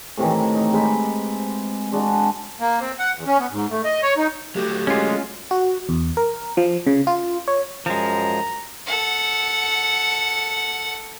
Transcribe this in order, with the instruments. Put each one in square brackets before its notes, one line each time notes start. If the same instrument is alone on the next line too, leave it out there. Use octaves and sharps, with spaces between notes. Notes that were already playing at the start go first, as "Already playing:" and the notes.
[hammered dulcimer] A2 C3 D#3 E3
D#4
C3 G#3 B5 D6
G#3 D4 F#4
[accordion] A#3
C4
F#5
E2
C#4
B3
G#2
A3
D#5
C#5
D#4
[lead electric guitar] F#3 A3 [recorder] G4
[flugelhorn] G#3 [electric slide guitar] C#4 F4
[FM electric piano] F#4
E2
A#4
F3
C#3
F4
C#5
[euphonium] F#2 [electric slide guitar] F3 G#3 [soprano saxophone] A#5
[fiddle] A4 F#5